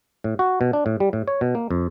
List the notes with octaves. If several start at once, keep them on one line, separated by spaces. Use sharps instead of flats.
A2
F#4
B2
D4
A2
G3
A2
C#5
B2
A#3
F2